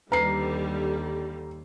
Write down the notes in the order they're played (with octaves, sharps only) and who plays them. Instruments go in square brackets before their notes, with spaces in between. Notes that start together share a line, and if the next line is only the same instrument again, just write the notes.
[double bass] D#2 [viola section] D3 G3 [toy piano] B4 [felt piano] A#5 C7